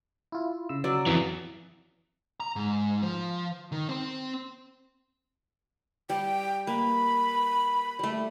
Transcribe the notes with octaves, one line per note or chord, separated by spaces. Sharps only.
E4 F4
C#3 E6
F#3 D5
F2 E3
A#5
G#2
F3
D#3
C4 C5
G3 G5
A#3 B5
G3 A3